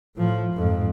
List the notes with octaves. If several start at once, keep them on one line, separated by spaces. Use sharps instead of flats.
A2 F3
F2 G#2